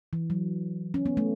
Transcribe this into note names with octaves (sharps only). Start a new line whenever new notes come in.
E3
F#3
C#4
B3
A3